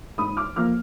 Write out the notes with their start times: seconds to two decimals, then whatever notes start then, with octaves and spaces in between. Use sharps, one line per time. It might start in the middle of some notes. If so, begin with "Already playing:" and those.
0.18 G#2 B5 D#6
0.37 D6 F6
0.56 F3 A#3 D6 F6